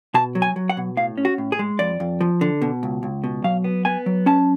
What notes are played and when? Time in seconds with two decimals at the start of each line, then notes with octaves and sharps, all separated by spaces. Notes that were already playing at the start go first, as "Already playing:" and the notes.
0.14 B2 A5
0.35 F#3
0.42 G#5
0.56 F#3
0.69 F#5
0.77 B2
0.97 A2 F5
1.18 C#4
1.25 F#4
1.38 A2
1.52 G#4
1.59 G#3
1.79 F2 D5
2.00 F2
2.21 F3
2.41 D3
2.62 B2
2.83 C#2
3.03 C#2
3.24 B2
3.44 F#3 F5
3.64 B3
3.85 B3 G#5
4.06 F#3
4.26 C#4 A5